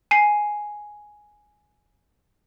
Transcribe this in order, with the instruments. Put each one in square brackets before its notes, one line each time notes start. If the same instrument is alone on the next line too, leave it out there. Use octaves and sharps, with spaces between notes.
[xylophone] G#5 C7